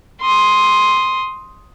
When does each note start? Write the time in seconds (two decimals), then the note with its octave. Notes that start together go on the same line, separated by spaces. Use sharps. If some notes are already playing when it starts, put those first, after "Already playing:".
0.21 C6 D#6